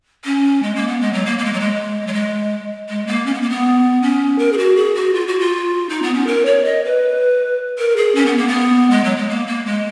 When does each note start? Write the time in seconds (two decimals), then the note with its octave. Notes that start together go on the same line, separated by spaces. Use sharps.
0.25 C#4
0.63 G#3
0.75 A#3
0.88 B3
1.01 G#3
1.13 F#3
1.25 A#3
1.38 A#3
1.45 G#3
1.53 F#3
1.60 G#3
2.07 F#3
2.13 G#3
2.89 G#3
3.07 A#3
3.26 C#4
3.34 B3
3.42 A#3
3.50 B3
4.02 C#4
4.39 A#4
4.52 G#4
4.58 F#4
4.76 G#4
4.95 F#4
5.14 F4
5.27 F#4
5.40 F4
5.89 D#4
6.03 B3
6.14 C#4
6.27 A#4
6.46 C#5
6.65 D#5
6.84 B4
7.79 A#4
7.97 G#4
8.15 C#4
8.26 B3
8.37 A#3
8.48 B3
8.91 G#3
9.04 F#3
9.17 G#3
9.29 A#3
9.47 A#3
9.66 G#3